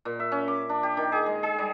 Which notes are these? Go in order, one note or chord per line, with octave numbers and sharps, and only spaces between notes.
A#2
E5
C#4
D6
D4
G4
D#3
G#4
G#3
G#4
G3